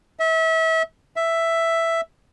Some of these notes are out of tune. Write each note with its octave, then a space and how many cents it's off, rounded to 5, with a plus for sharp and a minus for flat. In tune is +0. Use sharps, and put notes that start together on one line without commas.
E5 -30
E5 +5